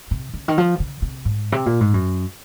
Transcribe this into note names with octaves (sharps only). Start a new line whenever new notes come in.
C3
C#3
D#3
F3
C#3
C3
G#2
C3
A#2
G#2
F#2